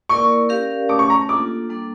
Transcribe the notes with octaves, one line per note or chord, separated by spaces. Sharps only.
A#3 E4 A#4 D5 C#6
C#4 G4 A#4 D5 F5
A3 C#4 G4 C#5 D6
C#6
A#5
A#3 D4 F4 A4 D6
G3 A#3 D4 A4